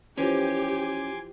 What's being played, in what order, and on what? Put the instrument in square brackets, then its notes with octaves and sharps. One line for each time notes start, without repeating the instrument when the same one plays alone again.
[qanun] E3 F3 [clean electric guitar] C#4 [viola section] G4 [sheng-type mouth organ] G#5 C6 D6